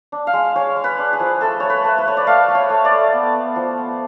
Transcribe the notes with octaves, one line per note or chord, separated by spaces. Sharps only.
D4
F5
G#3
G#3 C#5
G#3
B4
D4
G#4
F3
A3 A4
A3 C#5
B4
A3
B4
A3 C#5
D5
A3 F5
A3
C#5
A3
D5
A3
B3
B3
F3
B3